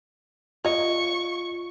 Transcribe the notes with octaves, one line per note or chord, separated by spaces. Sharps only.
F4 C#5 D#5 C#6